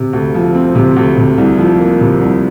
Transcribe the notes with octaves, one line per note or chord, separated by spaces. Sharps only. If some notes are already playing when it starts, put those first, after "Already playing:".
Already playing: C3
D2
F3
C4
C3
D2
C3
C2
F3
A#3
C3
C2